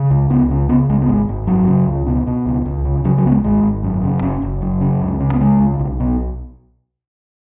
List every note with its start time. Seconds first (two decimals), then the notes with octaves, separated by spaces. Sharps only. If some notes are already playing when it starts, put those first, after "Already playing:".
Already playing: C#3
0.10 C#2
0.30 C#2 B3
0.50 C#3
0.69 C#3 B3
0.90 C#2 G#3
1.02 B3
1.08 G#1 G#3
1.29 G#1
1.47 F#2 F#3
1.68 C#3
1.87 C#2
2.07 B2
2.27 B2
2.46 C#2
2.65 C#2
2.85 C#3
3.05 C#3 F#3
3.18 F#3
3.25 C#2 B3
3.31 G#3
3.44 G#1 G#3
3.63 G#1
3.83 F#2
4.03 C#3
4.22 F#1 C#4
4.42 F#1
4.62 F#2
4.81 C#3
5.02 C#2
5.20 C#3
5.34 B3
5.41 C#3 G#3
5.60 C#2
5.79 B1
6.00 B2